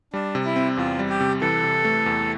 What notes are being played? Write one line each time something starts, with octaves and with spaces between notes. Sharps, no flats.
G3 D4
C3
E4
C4
E2 F4
G3
G4
C3
E3 A4
C3
A3
E2